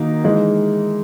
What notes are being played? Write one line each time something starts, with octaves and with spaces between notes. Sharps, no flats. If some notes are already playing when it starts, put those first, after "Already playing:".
Already playing: D#3 A#3 D#4 F#4
E3 G#3 D#4